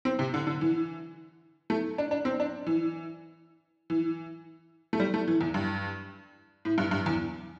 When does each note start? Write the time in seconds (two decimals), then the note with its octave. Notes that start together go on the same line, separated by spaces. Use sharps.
0.05 C4
0.19 C3
0.34 D3
0.47 D3
0.61 E3
1.70 A3
1.98 D4
2.11 D4
2.25 C4
2.40 D4
2.67 E3
3.90 E3
4.93 A3
5.00 G3
5.14 A3
5.28 E3
5.41 E2
5.54 G2
6.65 A2
6.78 G2
6.91 G2
7.06 E2